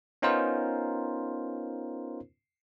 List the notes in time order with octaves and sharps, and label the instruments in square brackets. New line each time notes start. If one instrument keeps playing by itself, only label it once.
[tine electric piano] B3 C#4 D#4 F4 A#4 C5